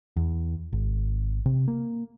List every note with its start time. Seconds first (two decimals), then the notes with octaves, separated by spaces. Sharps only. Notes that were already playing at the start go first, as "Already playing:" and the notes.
0.16 E2
0.73 G#1
1.46 C3
1.68 A#3